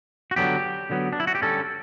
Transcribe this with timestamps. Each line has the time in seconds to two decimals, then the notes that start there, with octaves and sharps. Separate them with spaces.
0.31 F#4
0.36 D3 F#3 B3 G4
0.90 D3 F#3 B3
1.13 D4
1.20 E4
1.27 F#4
1.35 G4
1.42 D3 G3 C#4 A4